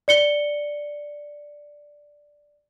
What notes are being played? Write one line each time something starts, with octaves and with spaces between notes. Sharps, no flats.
D5 C#7 G7